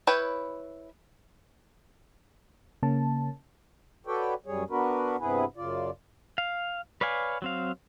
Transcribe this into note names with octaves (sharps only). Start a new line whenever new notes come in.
E4 B4 C#5 G5
C#3 A#3 C#4 A5
F#4 A4 B4 C#5 D5 G5
F#2 G3 G#4 C#5
B3 D4 F#4 A#4 B4
G2 C3 B3 E4 G#4 B4
F#2 C#3 F4 D5
F5
B4 C#5 D5 F5 G#5
F#3 C4 F5